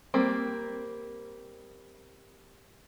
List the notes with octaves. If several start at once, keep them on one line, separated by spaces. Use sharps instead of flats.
G3 A#3 C4